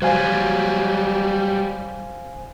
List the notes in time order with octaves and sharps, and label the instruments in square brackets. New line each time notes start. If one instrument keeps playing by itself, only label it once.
[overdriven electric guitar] F#3 G3 [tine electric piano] C5 F5 G#5